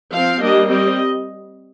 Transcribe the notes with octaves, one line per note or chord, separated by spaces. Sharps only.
F3 C4 F5
G3 A#3 D4 D#5
G3 C4 D#5